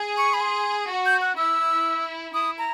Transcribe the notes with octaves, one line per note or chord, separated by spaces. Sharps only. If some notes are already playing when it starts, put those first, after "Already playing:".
Already playing: G#4
C#6
B5
C6
F#4
G6
F#6
E4 E6
E4 D#6
A#5